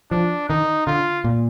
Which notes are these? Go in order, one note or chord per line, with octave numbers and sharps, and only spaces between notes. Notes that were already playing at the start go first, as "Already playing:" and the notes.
F3 D4
D#3 D#4
D3 F4
A#2